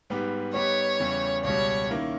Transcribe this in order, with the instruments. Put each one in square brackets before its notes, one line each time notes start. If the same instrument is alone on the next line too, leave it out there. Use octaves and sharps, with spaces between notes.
[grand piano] G#2 G3 B3 G4 B4
[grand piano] G3 B3 D#4 G4 B4 [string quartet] C#5
[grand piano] E2 C#3 E3 G3
[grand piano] C#2 B2 G3 [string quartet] C#5
[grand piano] D#3 A#3 C#4 E4